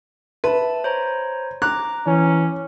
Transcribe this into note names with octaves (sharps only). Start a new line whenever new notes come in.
B4 E5 A5
C5 C#5 A#5
A#5 D6 F#6
E3 C#4